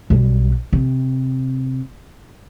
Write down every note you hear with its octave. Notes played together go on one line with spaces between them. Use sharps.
B1 G3
C3